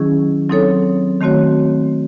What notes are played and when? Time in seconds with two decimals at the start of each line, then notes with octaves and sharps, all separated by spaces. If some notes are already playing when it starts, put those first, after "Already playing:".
Already playing: D#3 F#3 C#4 E4 G#4
0.49 F#3 C4 D#4 A4 C#5
1.20 D#3 A3 C4 F#4 C#5